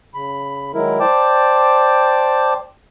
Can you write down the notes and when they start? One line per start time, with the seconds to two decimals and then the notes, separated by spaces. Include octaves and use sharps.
0.14 C#3 B5
0.74 D#3 F#3 G#3 E4 A#4
1.00 C5 D5 G5 A5 D6